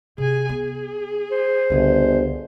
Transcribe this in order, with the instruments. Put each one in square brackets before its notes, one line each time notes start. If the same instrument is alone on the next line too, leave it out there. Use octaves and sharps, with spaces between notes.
[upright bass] C3 [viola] G#4 G#5
[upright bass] B3 [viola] G#4
[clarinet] C5
[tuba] G1 [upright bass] C#2 D3